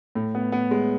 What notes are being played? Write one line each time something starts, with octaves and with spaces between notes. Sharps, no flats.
A2
B3
B3
G#3